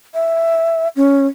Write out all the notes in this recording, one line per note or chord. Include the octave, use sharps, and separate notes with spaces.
E5
C#4